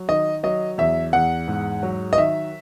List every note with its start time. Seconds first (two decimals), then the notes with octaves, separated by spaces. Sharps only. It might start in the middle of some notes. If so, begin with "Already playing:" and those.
Already playing: F#3
0.09 D#3 D#5
0.43 F#3 D#5
0.78 E2 E5
1.13 E2 F#5
1.48 G#2
1.83 F#3
2.13 D#5
2.17 D#3 E5